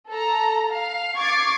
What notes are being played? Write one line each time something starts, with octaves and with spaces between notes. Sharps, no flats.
A4 A#5
F5
C#6 D6 G#6 A6 C7